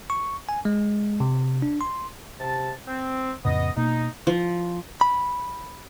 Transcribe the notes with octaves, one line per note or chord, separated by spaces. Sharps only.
C#6
G#5
G#3
C3
D4
C6
C3 A5
C4
F2 A2 C#3 B3 D#5
B2 A#3 D#4
F3
B5